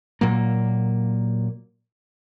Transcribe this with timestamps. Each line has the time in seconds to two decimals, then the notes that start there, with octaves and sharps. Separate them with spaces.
0.21 A#2 F#3 A#3